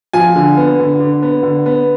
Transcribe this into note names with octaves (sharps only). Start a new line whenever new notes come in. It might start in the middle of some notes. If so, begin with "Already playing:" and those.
F3 G#5
D3
B3
D3
D3
B3
D3
B3